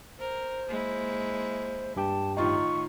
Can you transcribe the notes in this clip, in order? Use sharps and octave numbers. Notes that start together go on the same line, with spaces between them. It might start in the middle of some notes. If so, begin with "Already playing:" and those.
A#4 C5
G#3 A#3 E4
G2 G4 G5 A5
A2 D#3 D#4 F4 C#6